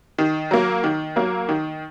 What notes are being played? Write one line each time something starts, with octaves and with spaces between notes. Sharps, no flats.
D#3
F#3 A#3
D#3
F#3 A#3
D#3